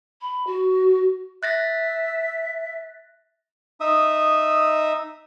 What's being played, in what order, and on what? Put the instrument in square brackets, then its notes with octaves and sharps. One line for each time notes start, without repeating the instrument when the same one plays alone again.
[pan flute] B5
F#4
[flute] E5 [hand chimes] F#6 A6 A#6
[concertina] D#4 E5 D#6